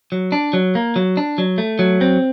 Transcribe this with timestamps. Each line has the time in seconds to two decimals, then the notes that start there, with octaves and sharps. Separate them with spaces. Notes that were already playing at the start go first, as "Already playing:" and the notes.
0.12 F#3
0.32 D4
0.53 F#3
0.75 A#3
0.96 F#3
1.17 D4
1.38 F#3
1.58 A3
1.79 F#3
2.01 C4